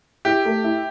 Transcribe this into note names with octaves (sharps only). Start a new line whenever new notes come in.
E4 G4
A3
E4